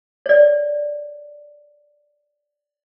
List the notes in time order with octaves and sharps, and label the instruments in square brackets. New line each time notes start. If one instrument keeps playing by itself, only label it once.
[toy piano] C#5 D5